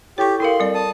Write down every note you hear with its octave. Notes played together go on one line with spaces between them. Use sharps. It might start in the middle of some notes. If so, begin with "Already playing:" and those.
E4 G4 A4 C#5 C#6
E4 A4 A#4 F5 C6 F#7
G3 C4 D5
A5 D#6